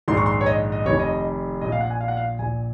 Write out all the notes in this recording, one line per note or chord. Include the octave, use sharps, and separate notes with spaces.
A#1 G#2 D#3 C6
C#6
C6
C#5
D#5
D#5
F1 F2 D#3 C#5
D#5
A#1 A#2 D#5
F5
F#5
G#5
F5
F#5
F5
A#1 A#2 G#5